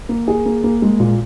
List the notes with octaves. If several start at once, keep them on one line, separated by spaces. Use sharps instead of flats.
A#3
G#4
A#3
A#3
G#3
A#2